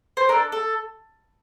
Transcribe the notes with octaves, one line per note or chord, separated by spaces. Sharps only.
C5
D4 A4 A#4
A4